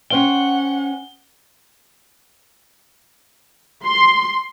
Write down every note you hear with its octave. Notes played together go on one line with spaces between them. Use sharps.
C#4 C5 F#5 G5 G7
C6